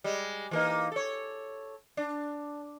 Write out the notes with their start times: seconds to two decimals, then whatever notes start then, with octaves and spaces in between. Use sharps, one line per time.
0.04 G3 G#3
0.51 E3 A#3 D#4
0.92 A4 C#5
1.97 D4